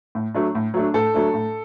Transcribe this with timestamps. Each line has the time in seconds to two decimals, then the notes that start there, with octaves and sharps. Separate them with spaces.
0.15 A2
0.34 F#3 A3 D4
0.55 A2
0.74 F#3 A3 D4
0.94 A2 A4
1.14 F#3 A3 D4
1.34 A2